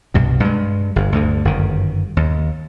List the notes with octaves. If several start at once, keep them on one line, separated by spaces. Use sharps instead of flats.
C2 G2 B2
G2 G#3
G1 G2
D2 G2 D3
G1 F#2 D#3
D#2